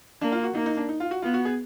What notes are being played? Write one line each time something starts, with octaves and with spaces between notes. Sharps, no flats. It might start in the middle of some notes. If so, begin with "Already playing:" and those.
A#3 D4
F4
F#4
A#3 D#4
D#4
D4
D#4
F4
F#4
B3 F4
F#4
G#4